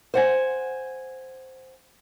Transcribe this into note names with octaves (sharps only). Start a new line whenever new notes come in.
C5 F#5 G#5